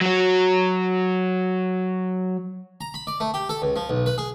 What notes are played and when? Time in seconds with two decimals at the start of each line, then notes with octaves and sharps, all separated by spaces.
0.01 F#3 F#4
2.81 A#5
2.94 B5
3.07 D5
3.20 A3
3.34 G4
3.49 A4
3.62 C#2
3.76 F3
3.89 B1
4.06 B4
4.18 G#4